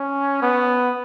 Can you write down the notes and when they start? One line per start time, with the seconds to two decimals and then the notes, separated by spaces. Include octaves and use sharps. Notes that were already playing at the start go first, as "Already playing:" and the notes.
Already playing: C#4
0.42 B3